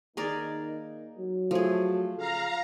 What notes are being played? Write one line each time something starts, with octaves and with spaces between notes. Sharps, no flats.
D#3 A#3 D#4 G#4 A#4 D5
F#3
F3 A3 G#4
C#3 F5 A#5